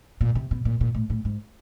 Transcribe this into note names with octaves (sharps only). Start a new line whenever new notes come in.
A#2
C3
B2
A#2
A#2
A2
A2
G#2